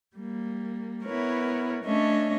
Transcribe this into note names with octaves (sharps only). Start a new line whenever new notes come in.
G3 A#3
B3 E4 A#4 B4 C#5
A3 C#4 D4 C#5 D#5 E5